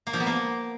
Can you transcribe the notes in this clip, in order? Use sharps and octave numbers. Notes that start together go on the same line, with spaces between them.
A#3
F3
B3
A#3